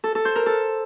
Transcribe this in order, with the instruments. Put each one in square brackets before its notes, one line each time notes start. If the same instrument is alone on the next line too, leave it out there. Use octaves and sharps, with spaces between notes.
[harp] A4
A4
C5
A#4
A4